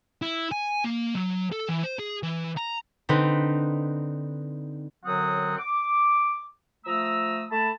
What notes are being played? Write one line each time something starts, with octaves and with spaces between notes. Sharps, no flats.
E4
G#5
A#3
F#3
A4
E3
C5
G#4
E3
A#5
D3 C4 D#4 B4
F#2 D3 F#3 C4 F#5 D#6
D6
F3 A3 A#5 D#6 E6
A3 A5 B5